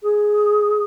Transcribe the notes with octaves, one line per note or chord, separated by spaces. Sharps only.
G#4